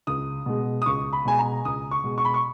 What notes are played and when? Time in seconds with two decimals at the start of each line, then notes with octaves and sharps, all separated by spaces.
0.07 C#2 D#6
0.46 B2 G#3
0.82 D#6
0.86 C#2 C#6
1.13 B5
1.25 B2 G#3 G#5
1.39 A#5
1.65 C#2 D#6
1.91 C#6
2.04 B2 G#3
2.18 C#6
2.25 B5
2.34 C#6